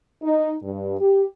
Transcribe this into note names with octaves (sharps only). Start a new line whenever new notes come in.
D#4
G2
G4